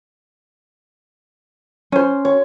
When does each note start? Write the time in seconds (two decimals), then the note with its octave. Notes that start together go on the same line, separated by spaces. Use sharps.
1.92 C#4 C5
2.25 C#5